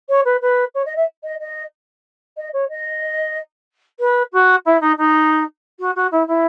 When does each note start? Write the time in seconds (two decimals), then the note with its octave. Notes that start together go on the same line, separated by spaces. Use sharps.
0.09 C#5
0.25 B4
0.41 B4
0.74 C#5
0.85 D#5
0.96 E5
1.23 D#5
1.40 D#5
2.37 D#5
2.53 C#5
2.69 D#5
3.99 B4
4.32 F#4
4.65 E4
4.81 D#4
4.97 D#4
5.79 F#4
5.95 F#4
6.11 E4
6.27 E4